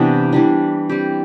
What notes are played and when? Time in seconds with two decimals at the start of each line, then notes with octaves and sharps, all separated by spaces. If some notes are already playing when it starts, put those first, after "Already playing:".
Already playing: C3 E3 B3 D4
0.33 E3 G3 D4
0.89 G3 C4 G4